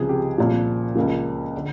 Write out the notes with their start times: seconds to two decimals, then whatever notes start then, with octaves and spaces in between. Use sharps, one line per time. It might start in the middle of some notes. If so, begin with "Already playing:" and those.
Already playing: C#2 C3 F3 G#4
0.09 G4
0.38 C2 A#2 F3
0.95 C#2 C#3 F3 A#3
1.57 D3